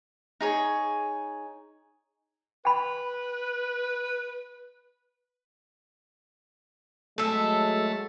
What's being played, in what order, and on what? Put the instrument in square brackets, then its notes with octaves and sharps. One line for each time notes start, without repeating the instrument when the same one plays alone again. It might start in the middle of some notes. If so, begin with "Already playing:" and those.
[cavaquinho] D#4 G#4 C#5
[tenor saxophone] B4 [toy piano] G5 B5
[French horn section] F#3 G#3 [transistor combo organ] A3 [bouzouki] A4 E5